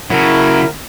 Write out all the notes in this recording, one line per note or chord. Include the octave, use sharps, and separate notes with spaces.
C#3 F#3 E4 A#4